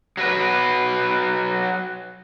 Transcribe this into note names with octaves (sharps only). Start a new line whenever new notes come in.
F#3 F#4 B4